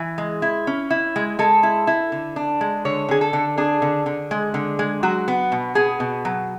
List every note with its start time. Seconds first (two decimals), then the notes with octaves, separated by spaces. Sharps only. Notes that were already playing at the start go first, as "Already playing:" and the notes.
Already playing: E3 G#5
0.18 G#3
0.42 E4
0.67 C#4
0.90 E4
1.16 G#3
1.39 G#3 A4
1.63 E4
1.87 E4
2.12 D3
2.36 D4
2.61 G#3
2.85 D3 C#5
3.09 D3 G#4
3.21 A4
3.33 D3
3.58 D4 G#4
3.82 D3
4.06 D3
4.31 G#3
4.54 D3
4.79 G#3
5.03 F#3 F#4
5.28 B3
5.52 B2
5.75 B3 G#4
6.00 B2
6.25 F#3